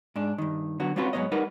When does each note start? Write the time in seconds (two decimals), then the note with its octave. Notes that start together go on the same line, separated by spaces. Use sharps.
0.16 G#2 D4
0.38 G2 D#3
0.80 D3 F#3 B3 F#4
0.96 G3 C4 C#4 F4 F#4 B4
1.13 G#2 F#3 B3 C#5 D#5
1.32 G3 D#4 A#4 B4 F#5